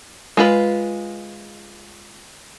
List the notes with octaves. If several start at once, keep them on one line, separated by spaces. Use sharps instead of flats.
G#3 F4 B4